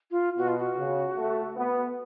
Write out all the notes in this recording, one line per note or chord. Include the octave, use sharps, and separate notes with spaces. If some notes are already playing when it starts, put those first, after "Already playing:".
F4
B2 F#4
F4
F#4
C#3
A3
B3